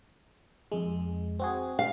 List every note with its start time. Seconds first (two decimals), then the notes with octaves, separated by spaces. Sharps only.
0.72 F2 G#3
1.40 C4 F#4 G#4
1.79 F5